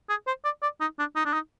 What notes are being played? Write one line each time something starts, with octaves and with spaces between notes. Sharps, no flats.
G#4
C5
D5
D5
D#4
D4
D#4
D4
D#4